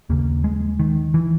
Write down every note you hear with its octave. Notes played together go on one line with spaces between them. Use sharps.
D#2 C#3 A#3
G#3
D#3
E3